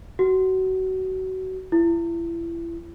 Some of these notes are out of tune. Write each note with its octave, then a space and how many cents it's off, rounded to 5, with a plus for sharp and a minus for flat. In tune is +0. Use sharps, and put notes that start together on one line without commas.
F#4 +25
E4 +30